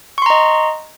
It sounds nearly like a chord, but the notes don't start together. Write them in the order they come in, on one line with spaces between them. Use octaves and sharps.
C#6 C6 A#5 D#5